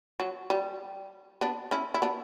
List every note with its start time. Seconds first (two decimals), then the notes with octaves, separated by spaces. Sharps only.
0.20 F#3
0.50 G3
1.41 B3 D4
1.71 C#4 E4
1.94 E4
2.02 B3 D4